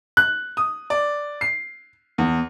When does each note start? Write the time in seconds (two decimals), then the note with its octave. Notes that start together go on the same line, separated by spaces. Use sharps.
0.17 F#6
0.57 D#6
0.90 D5
1.41 C7
2.18 E2